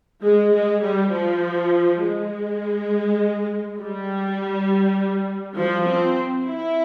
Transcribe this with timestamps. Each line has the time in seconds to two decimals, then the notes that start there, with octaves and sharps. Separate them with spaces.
0.22 G#3
0.52 G#3
0.82 G3
1.11 F3
2.01 G#3
3.78 G3
5.56 F3
5.86 C4
6.45 E4